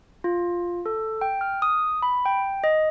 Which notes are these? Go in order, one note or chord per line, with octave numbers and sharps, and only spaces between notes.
F4
A4
G5
F6
D#6
B5
G5
D#5